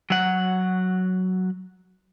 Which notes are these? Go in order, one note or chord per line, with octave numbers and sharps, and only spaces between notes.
F#3 F#5